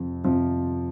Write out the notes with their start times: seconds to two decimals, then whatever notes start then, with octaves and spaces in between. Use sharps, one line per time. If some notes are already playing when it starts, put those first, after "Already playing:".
Already playing: F2 C3 F3
0.24 F2 C3 F3